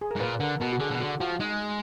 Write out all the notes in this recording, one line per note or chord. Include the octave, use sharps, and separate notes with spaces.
G#4
A#4
G#2
A#2 B4
D3 A#4
B2 A#4
F#4
D3 G#4
B2
D3 F#4
F3 F#4
G#3 D#4